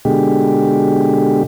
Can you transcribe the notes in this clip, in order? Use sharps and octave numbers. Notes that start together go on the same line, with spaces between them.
B2 D3 G#3 G4